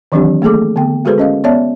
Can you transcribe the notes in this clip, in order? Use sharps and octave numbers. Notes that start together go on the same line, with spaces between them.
D#3 E3 F#3 C4 D4 G4
A3 A#3 G#4 A4 D6
D3 B3 G5
G#3 F#4 G#4 A4 B4 C5
C#4 D#5 F5
B3 C#5 D5 E5 A5